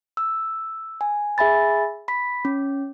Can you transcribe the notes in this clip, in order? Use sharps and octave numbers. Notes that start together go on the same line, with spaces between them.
E6
G#5
G#4 E5 G#5 B5 A6
B5 B6
C#4